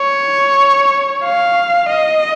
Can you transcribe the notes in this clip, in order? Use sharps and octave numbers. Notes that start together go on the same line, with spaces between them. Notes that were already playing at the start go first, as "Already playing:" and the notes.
Already playing: C#5
F5
D#5